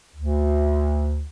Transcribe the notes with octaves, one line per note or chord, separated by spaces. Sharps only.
D2